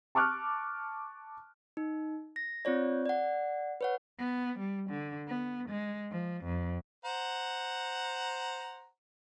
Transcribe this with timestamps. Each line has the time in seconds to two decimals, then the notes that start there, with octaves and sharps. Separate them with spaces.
0.15 A5 C#6 D6 F6 F#6
1.77 D#4
2.36 A#6
2.65 C4 F4 C#5 D5
3.06 D5 F#5
3.81 B4 C#5 F#5
4.19 B3
4.59 G3
4.90 D3
5.27 B3
5.69 G#3
6.11 F3
6.44 F2
7.05 C5 F#5 A#5